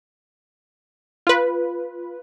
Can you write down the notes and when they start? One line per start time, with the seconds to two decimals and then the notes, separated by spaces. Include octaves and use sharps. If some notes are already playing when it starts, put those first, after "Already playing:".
1.27 F4 B4